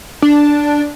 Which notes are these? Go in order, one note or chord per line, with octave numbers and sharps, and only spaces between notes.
D4